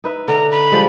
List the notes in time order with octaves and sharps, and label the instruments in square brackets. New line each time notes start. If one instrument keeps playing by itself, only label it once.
[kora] D#4 B4 E5
[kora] D3 [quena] A#5
[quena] B5
[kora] F3 G3 G#3